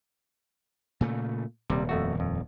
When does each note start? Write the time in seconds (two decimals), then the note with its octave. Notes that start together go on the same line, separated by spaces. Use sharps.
1.01 A#2 C#3 A3
1.70 D#1 C3 G3
1.89 F2 A3 F#4
2.20 F2